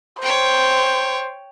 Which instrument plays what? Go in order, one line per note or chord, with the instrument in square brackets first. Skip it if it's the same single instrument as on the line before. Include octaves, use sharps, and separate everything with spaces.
[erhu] C5 [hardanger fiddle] C#5 G5